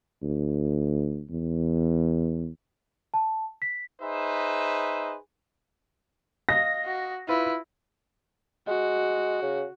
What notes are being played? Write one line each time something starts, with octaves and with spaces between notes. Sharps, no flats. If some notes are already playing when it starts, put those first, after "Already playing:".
D2
E2
A5
B6
D#4 G#4 B4 C5 D#5 E5
D#5 F5 A#6
F#4
E4 F4 B4
G#3 F#4
C#3